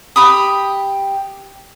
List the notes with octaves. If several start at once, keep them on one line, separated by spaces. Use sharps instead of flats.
G4 B5 D#6